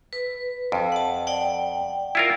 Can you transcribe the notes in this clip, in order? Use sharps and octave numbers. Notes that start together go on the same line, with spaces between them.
B4
F2
F#5 A5
D5 F#5 G5
E4 F4 A#4